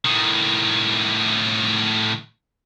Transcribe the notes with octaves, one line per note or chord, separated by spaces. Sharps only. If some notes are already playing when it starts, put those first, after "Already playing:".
A2 D#3